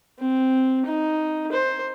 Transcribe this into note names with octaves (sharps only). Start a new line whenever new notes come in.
C4
D#4
C5